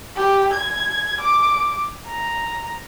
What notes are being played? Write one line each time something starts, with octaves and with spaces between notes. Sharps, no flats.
G4
G#6
D6
A#5